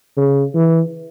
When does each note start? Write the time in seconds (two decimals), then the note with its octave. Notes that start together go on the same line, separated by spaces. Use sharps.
0.17 C#3
0.55 E3